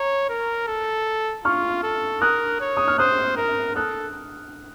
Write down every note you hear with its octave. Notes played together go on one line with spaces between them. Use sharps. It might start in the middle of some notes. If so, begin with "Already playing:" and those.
Already playing: C#5 A#5
A#4
A4
F4 C#6 F6
A4
A#4 D#6 F#6
C#5
D#6
F6
C5 D#6 F#6
A#4
A4 D#6 F#6